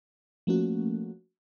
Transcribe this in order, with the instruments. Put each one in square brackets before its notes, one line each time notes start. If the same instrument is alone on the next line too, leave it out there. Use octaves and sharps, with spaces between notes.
[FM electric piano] F3 A3 A#3 C#4 F#4